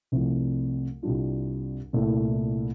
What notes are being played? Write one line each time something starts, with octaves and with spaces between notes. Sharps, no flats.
C2 C3 F3 A3
C2 C3 G3 D4 F4
C2 A#2 A3 E4